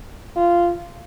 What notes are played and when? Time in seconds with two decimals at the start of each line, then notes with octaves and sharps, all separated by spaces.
0.36 F4